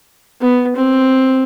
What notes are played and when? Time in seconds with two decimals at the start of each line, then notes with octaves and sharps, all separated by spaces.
0.41 B3
0.76 C4